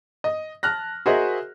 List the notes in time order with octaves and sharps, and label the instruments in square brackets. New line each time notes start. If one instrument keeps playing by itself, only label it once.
[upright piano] D#5
A5 F6 F#6 A#6
F#4 G#4 A#4 C5 D#5 E5